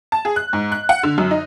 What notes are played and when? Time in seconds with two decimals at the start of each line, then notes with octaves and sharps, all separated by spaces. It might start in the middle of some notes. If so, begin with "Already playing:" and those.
0.12 A5
0.25 G#4
0.36 F#6
0.53 G#2
0.72 F#6
0.89 F#5
1.03 D3
1.18 F#2
1.31 D#4